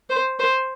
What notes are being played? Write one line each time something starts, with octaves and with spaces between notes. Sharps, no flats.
C5
C5